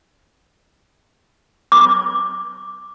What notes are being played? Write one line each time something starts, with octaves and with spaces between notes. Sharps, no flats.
D6